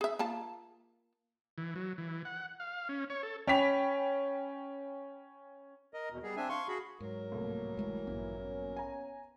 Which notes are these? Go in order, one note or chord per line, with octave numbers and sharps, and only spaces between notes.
G#4 E5
A#3 F4 A5
E3
F#3
E3
F#5
F5
C#4
C#5
A4
C#4 G5 B5 B6 F7
A#4 D#5
E2 B2
G3 B3 G#4
C4 D4 E5 G#5
F5 C6 C#6
F#4 G#4 B5
G#2 F#3 A#4
C2 A2 A#3
F#1 E3 G#3 A3
A1 G2 A#2
B3 C#4
G#5 A#5